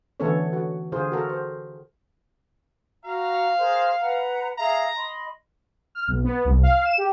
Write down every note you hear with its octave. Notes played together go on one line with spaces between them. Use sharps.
D3 E3 B3 C#4 A4 C#5
F#4
D3 F4 G#4 C5
F#4 A4 A#4
C5
F#4 F5 A#5
G#4 A#4 C5
B4 F#5 A#5
G#4 E5 F5 A#5
D#5 B5 C6
F6
B1
B3
C2
F5
E7
G4